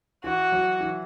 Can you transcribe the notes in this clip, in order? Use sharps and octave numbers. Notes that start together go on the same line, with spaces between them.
E3 F#4
F#3
E3